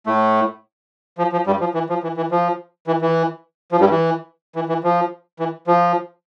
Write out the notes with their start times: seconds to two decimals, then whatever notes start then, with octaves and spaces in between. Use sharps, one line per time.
0.06 A2 A3
1.18 F3
1.32 F3
1.47 G2 G3
1.60 F3
1.74 E3
1.89 F3
2.03 E3
2.17 E3
2.31 F3
2.87 E3
3.02 E3
3.72 F3
3.80 G2 G3
3.91 E3
4.56 E3
4.69 E3
4.84 F3
5.40 E3
5.67 F3